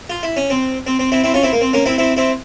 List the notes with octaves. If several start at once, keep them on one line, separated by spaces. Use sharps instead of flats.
F4
E4
C#4
C4
C4
C4
C4 E4
C4 E4
C#4 F4
C4 E4
A#3
C4
A#3 C#4
C4 E4
C4 E4
C4 E4